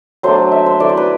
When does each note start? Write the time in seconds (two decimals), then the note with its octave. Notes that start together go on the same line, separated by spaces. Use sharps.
0.23 F#3 A3 D4 C5
0.52 E5
0.66 C5
0.80 A3 E4 D5
0.89 C5
0.97 B4